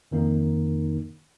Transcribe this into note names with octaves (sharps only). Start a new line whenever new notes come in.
F2 D#3 A#3 D#4 A#4